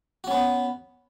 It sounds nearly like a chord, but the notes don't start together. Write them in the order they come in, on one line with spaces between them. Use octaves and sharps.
F#4 C#4 B3